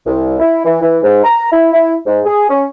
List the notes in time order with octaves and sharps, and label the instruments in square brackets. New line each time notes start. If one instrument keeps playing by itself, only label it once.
[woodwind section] C2
E4
E3
E3
G#2
A#5
E4
E4
G#2
G#4
C#4